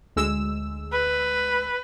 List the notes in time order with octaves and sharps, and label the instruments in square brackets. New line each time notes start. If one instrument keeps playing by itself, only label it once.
[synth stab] D2 G#3 E6
[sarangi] B4